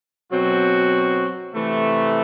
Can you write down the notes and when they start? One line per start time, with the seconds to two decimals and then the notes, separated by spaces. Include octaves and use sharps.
0.31 B2 F#3 C4 F#4
1.53 C3 E3 A3